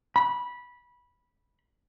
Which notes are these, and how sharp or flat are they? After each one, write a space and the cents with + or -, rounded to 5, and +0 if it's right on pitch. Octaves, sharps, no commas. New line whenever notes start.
B5 -15